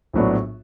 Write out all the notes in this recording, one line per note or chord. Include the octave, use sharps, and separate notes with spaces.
A#1 A2 F#3 B3 D4